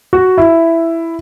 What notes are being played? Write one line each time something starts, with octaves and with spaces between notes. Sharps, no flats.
F#4
E4